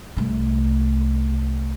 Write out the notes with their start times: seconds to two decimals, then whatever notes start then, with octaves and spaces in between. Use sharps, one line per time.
0.17 C2 A3